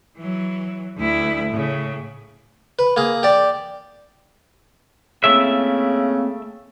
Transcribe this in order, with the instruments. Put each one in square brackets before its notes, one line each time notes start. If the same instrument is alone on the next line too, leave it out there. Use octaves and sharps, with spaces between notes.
[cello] E3 F#3
D2 E4
A2 C#3
[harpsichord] B4
A#3 G#4
G4 D5
[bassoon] C#3 [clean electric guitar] A3 E4 E5 [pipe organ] A#3 C4